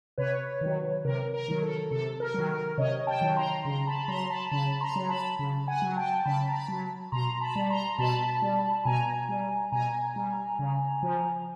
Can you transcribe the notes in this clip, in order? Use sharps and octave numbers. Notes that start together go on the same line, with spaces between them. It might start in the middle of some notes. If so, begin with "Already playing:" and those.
C3 B4 C#5
D#3 F#3
C3 A#4
A#4
D#3 F#3
A4
C3 A4
A#4
D#3 F#3
A#4
C3 C#5 D#5
G5 A5
D#3 F#3
A#5 C6
C#3 A#5 C6
A5 B5
B5
F#3 A#5 C6
A5 B5
C#3 A5 B5
A#5 C6
F#3
A5 B5
C#3
F#5 G#5
F#3
G5 A5
C#3 A5 B5
A#5
A5 B5
F#3
B2 A#5 C6
A5 B5
G3
A#5 C6
B2 A5 B5
G3
B2 G#5 A#5
G3
B2 G#5 A#5
G3
C#3
F3